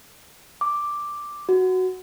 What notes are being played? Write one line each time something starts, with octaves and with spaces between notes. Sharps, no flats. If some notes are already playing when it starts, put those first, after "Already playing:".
D6
F#4